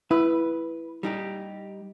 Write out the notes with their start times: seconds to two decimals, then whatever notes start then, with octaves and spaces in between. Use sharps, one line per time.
0.11 E4 B4
1.03 G3 D#4 G4